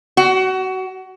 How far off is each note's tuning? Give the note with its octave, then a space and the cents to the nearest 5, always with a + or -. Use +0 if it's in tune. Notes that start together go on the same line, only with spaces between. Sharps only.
F#4 +25